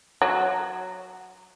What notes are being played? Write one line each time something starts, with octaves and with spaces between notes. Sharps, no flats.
F#3